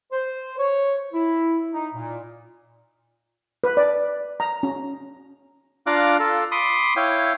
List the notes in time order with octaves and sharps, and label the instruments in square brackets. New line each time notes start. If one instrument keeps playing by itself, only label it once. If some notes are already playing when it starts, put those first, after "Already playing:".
[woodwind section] C5
C#5
E4
D#4
A#2
[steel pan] B4
D5
A#5
C#4
[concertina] D4 F4 F5 A#5 D6 F#6
F4 A4
B5 C6 D6 D#6
E4 C#5 F5 G5